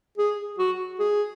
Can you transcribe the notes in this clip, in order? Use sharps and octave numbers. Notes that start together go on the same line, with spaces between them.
G#4
F#4
G#4